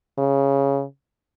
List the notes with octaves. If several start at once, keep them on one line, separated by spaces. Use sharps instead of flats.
C#3